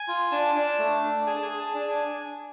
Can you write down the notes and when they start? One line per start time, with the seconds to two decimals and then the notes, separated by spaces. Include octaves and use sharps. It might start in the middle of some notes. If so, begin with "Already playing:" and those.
Already playing: G#5
0.08 F4
0.32 D4 A5
0.55 D4
0.79 A3
1.03 D4
1.27 G#4 G#5
1.35 A5
1.42 G#5
1.51 G#4
1.58 A5
1.74 D4
1.90 G#5